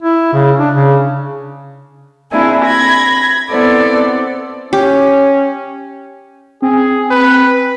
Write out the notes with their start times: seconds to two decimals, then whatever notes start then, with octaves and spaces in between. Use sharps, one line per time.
0.02 E4
0.33 C#3
0.59 D4
0.75 C#3
2.32 A#3 C4 D4 E4 G#4 G#5
2.63 B5 G#6 A#6
3.50 B3 C4 E4 A4 C5 D5
4.73 C#4 G4
6.62 C4 G#4
7.11 B4